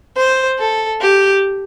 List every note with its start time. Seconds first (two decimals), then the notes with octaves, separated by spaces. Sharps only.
0.16 C5
0.59 A4
1.01 G4